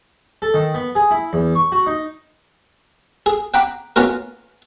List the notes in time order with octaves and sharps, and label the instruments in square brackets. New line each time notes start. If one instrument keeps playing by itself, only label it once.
[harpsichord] A4
D#3
B3
G#4
E4
E2
C#6
F#4
D#4
G#4
F#5 G5 A#5 B5 D6
B3 C#4 F4 F#4 A#4